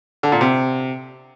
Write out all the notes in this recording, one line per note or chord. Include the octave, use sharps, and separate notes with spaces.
D3
A#2
C3